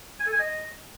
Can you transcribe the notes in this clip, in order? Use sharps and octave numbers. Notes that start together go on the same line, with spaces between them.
G#5
A4
G#5
D#5